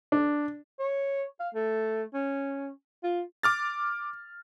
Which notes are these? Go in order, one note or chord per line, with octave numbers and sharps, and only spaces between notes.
D4
C#5
F5
A3
C#4
F4
D6 F6 A6